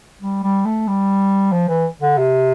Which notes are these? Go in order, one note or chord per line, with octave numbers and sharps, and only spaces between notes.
G3
G3
A3
G3
F3
E3
D3
C3